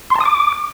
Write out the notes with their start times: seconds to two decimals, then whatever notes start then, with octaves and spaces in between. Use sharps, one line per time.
0.10 C6
0.15 A5
0.20 D#6
0.25 D6